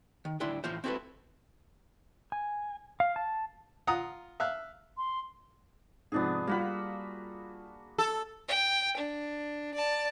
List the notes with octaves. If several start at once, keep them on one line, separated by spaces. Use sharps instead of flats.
D#3
D2 G3 D4 E4 C6
A2 E3 F4 C5
C4 E4 F#4 A4 B4
G#5
F5
A5
F4 F#5 A#5 D#6
E5 F5 F#6
C6
G#2 C3 F3 B3 D4 G#4
G3 A#3 F4 F#4 B5
A4
G5
D4
D5 A5